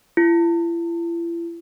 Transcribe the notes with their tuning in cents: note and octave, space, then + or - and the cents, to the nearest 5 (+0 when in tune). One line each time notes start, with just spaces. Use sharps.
E4 +40